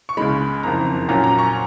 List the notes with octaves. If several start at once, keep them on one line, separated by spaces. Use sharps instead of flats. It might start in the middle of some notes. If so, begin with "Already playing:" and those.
C#6
C#2 C#3 G#3 B5
F#1 F2 D#3 A#5
A#2 F#3 C#4 F4 A#5
A#5
C#6